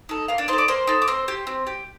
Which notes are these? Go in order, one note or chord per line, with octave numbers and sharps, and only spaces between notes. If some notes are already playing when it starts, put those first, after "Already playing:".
D#4 A4
A#3 F4 F5
D4 D5
D#4 C5 C6
A4
D5 D6
A#3 C5 C6
D#4 A4
D6
C4 C5 C6
G4
C4
G4